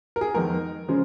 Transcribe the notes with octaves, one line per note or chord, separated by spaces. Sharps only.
A#4
G#4
F2 D#3 G#3 B3 D#4 A#4
C#3 F3 G#3 C#4